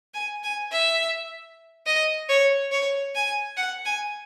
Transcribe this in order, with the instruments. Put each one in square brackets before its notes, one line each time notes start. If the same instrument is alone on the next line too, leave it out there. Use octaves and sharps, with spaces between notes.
[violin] G#5
G#5
E5
D#5
C#5
C#5
G#5
F#5
G#5